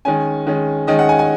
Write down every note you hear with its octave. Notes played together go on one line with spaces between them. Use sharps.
D#3 G#3 C#4 G#5
D#3 G#3 C#4
D#3 G#3 C#4 D#5
F#5
G#5
G#5